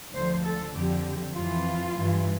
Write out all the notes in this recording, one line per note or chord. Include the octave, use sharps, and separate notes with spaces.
D2 D3 F3 C5
A4
F2 D3 F3 G4
F2 E3 F4
G2 E3